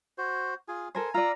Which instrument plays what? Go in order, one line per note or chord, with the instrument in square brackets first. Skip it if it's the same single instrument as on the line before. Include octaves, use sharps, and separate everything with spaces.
[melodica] F#4 C5
F4 G#4 G#5
[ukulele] A4 A#4 C5 [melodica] G#5
[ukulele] F4 D5 [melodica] F5 E6 [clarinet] A#5